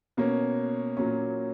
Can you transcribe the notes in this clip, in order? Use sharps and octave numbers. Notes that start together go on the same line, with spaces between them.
B2 A#3 C#4
A#2 F#3 A#3 C#4